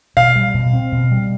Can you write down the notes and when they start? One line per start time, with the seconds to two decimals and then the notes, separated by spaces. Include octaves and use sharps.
0.17 B2 F5
0.36 G3
0.54 B2
0.73 C4
0.92 B2
1.11 G3